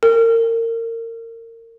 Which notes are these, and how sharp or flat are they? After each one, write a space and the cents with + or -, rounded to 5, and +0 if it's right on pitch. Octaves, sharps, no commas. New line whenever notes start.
A#4 -30